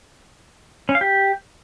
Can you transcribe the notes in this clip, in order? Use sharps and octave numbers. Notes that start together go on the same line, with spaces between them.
C#4
F5
G4